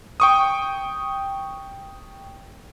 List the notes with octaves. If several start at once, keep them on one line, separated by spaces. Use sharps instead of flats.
G5 C#6 D#6